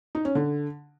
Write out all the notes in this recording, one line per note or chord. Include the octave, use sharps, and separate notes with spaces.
D#4
C#4
D3